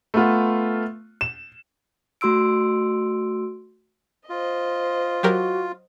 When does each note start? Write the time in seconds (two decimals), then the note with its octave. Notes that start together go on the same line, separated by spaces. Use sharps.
0.14 A3 B3 F4
1.21 E7
2.21 A3 F#4 C6 E6 D7
4.30 F4 C5 D#5
5.23 F#3 F#4 G4 A#4